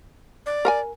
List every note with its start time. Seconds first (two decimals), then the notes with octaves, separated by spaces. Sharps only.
0.46 D5
0.65 A#4 F#5 G#5